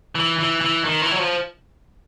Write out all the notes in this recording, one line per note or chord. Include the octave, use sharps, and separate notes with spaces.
E3
E3
E3
D#3
E3
F#3
F3